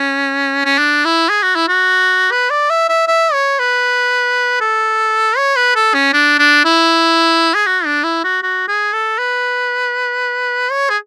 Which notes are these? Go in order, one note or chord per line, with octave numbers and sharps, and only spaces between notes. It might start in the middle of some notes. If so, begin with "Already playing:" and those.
Already playing: C#4
C#4
D4
E4
G#4
F#4
E4
F#4
B4
D5
E5
E5
E5
C#5
B4
A4
C#5
B4
A4
C#4
D4
D4
E4
G#4
F#4
D4
E4
F#4
F#4
G#4
A4
B4
C#5
G#4